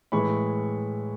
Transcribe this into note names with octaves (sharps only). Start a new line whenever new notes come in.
A2 E3 G#3 B5 C#6